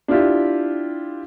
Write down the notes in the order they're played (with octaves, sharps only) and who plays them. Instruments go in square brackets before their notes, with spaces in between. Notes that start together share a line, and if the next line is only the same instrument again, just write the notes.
[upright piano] D4 E4 F4 G4